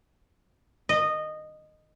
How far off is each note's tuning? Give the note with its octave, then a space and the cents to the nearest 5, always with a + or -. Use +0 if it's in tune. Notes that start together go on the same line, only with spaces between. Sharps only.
D#5 -15